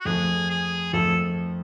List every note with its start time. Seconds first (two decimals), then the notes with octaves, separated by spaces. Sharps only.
0.01 F#4
0.05 F2 F3 A3 G#4
0.50 G#4
0.93 F2 F3 A3 A4